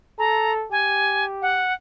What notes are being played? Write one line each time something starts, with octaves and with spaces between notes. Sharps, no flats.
A4 A#5
G4 G#5
F#5